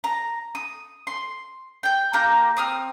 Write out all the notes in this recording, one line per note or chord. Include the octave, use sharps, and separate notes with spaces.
A#5
D#6
C6
G5 G6
A#3 G4 A#5 G6
C4 D#6 F6